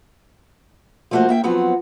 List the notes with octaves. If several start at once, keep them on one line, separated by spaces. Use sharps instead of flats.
F3 G3 A3 A#3 F#4 C5
A#3 E5 G5
F3 F#3 B3 C4